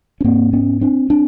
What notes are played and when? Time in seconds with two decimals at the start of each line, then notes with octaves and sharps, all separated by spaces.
0.21 C#4
0.24 G#2 A#3 C4
0.53 B3 C#4
0.81 C4 D4
1.10 C4 D4